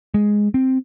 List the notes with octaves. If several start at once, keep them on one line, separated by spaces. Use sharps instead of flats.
G#3
C4